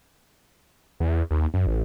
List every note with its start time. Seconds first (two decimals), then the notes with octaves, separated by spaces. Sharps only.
1.00 E2
1.31 D#2
1.54 F#2
1.67 A1